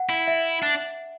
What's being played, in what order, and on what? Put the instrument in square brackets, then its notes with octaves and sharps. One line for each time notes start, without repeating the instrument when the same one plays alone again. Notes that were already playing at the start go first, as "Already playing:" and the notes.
Already playing: [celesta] F#5
[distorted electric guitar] E4
[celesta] E5
[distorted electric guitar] D4